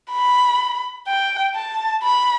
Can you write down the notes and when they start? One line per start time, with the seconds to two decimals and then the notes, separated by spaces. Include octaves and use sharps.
0.12 B5
1.07 G5
1.55 A5
2.03 B5